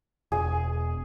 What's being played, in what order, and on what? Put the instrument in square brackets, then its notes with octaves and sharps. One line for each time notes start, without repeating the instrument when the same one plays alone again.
[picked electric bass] E1 [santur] G#4 G#5